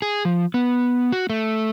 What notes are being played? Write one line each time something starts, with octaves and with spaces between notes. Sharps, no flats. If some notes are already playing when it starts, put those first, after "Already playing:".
G#4
F3
B3
F#4
A3